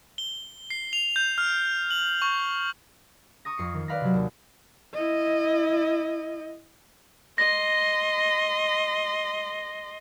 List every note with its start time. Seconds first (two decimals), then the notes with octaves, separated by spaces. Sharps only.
0.18 G7
0.70 C7
0.93 F7
1.16 G6
1.38 F6
1.91 F#7
2.22 C#6
3.45 A#5 C#6 D#6 A#6
3.58 F2 C7 C#7
3.74 D#3
3.88 B4 D5 F5 B5 F6 A#6
4.01 C3 F#3
4.14 D#2
4.94 E4 D#5
7.38 D#5 C6 A#6